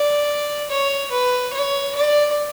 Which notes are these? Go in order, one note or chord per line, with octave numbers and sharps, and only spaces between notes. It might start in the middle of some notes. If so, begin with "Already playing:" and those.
Already playing: D5
C#5
B4
C#5
D5